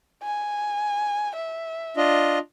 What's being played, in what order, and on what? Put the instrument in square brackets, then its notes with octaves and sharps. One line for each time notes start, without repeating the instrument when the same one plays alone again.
[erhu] G#5
E5
[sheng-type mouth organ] D4 F4 D#5